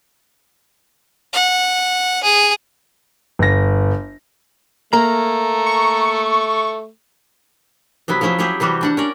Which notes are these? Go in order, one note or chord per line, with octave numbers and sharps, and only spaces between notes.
F#5
G#4
G1 A#6
A3 A#3 A#5
C#6
C3 F#3 B3 E4
F3 F#3 C#4 E4 C5
F#3 C#4 E4 G4 G#4
C3 E3 G3 F#4 G4
G3 D4 F#5
C#4 A#4 D5